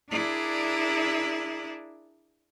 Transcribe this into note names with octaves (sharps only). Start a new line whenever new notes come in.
D4 E4 G#4 A#4 D5